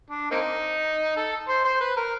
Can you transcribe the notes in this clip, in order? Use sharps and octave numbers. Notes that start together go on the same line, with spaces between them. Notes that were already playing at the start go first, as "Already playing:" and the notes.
D4
A#3 C4 D#4
A4
C5
C5
B4
A#4